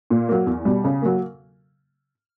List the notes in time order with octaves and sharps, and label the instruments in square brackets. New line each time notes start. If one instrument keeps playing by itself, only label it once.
[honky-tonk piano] A#2
F#3 A#3
E2
B2 G3
C#3
F#3 A#3